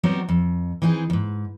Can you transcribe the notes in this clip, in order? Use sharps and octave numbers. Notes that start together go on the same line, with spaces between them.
F#3 G3 B3 C4 D#4 F#4
F2
E3 C4 D#4 F4 G#4
F2 G#2